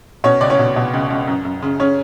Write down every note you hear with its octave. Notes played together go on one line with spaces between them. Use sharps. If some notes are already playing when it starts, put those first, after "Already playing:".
B2 C#4 C#5
C#2 D5
C#4 C#5
B2
B2
C#2
C#2
F#2
F#2
C#3
C#3 C#4 C#5